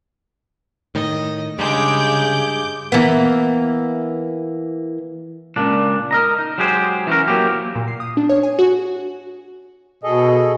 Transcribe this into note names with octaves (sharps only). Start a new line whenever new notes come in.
A2 D#3 D#5
G2 C#3 G#3 D6 G6
E3 A#3 B3
C#2 A#2 D4
A#4 D#5 A#5
D#4
F#3 G#3 G4 G#4 B4 C5
E3 C#4 F#4 A#4
F#3 A#3 C4 G4
A#2
C7
D#6
D4
C#5
G#5
F#4
B2 G#4 A4 D#5